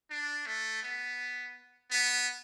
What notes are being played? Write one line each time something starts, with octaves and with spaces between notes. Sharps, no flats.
D4
A3
B3
B3